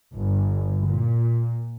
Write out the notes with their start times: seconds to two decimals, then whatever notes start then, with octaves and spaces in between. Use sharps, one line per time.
0.14 G1
0.86 A#2